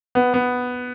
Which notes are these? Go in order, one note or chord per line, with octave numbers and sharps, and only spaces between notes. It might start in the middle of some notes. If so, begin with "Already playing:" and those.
B3
B3